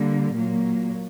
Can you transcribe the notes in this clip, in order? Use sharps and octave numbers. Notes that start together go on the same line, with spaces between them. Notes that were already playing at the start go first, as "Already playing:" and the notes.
Already playing: D3 G3 A#3
A#2 F#3 A#3